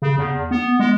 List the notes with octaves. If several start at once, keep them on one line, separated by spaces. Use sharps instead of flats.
C#3
E2
B3
G#3